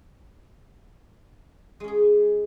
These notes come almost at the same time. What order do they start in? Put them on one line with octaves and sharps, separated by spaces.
G#3 C#4 G#4